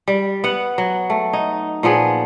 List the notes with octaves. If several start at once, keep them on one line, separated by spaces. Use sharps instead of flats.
G3
B3 F#5
F#3
A3
D#4
A#2 F3 B3 G#4